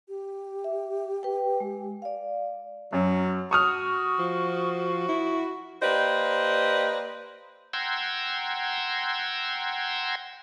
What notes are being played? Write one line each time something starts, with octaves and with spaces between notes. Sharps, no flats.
G4
E5
B4 G5
G#3
D5 F5
F#2 F#3
F#4 C#6 D#6 F6
F3
E4
A#3 G4 B4 C5 D5 D#5
F#5 G5 A#5 C6 E6 G#6